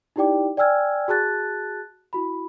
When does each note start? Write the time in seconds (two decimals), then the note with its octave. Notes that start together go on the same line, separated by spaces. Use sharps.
0.16 D#4 E4 G4 D5 G5 D6
0.57 D5 G5 G#5 E6 F6 G#6
1.08 F#4 G#4 A5 F#6 A6
2.13 E4 F#4 B5